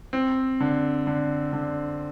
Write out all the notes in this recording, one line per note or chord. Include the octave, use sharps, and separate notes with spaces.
C4
D3
D3
D3